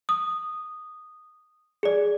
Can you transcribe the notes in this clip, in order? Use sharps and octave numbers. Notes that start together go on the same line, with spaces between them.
D#6
G#4 D5